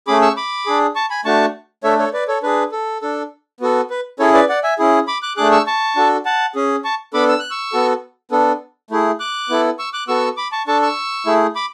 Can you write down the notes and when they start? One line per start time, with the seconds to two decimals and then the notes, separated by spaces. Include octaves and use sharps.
0.07 A3 C#4 G#4 B5 D6
0.22 C#6 E6
0.37 B5 D6
0.66 D4 G#4
0.96 A5 C#6
1.10 G#5 B5
1.25 A3 D4 F#4 A5 C#6
1.84 A3 D4 A4 C#5 E5
1.99 A4 C#5
2.13 B4 D5
2.28 A4 C#5
2.43 D4 G#4 B4
2.72 A4
3.02 D4 A4
3.60 B3 F#4 A4
3.90 B4
4.19 C#4 E4 G#4 A4 C#5
4.34 B4 D5
4.49 D5 F#5
4.64 E5 G#5
4.78 C#4 E4 G#4
5.07 B5 D6
5.23 D6 F#6
5.37 A3 D4 G#4 D6 F#6
5.52 C#6 E6
5.67 A5 C#6
5.96 D4 F#4 A4
6.25 F#5 A5
6.55 C#4 G#4
6.84 A5 C#6
7.14 B3 D4 A4 B5 D6
7.28 E6
7.39 F#6
7.50 C#6 E6
7.73 B3 F#4 A4
8.31 B3 D4 A4
8.91 A3 E4 G#4
9.20 D6 F#6
9.49 B3 E4 A4
9.79 C#6 E6
9.93 D6 F#6
10.08 B3 F#4 A4 C#6 E6
10.37 B5 D6
10.52 A5 C#6
10.67 D4 A4 A5 C#6
10.82 C#6 E6
11.26 A3 E4 G#4
11.55 B5 D6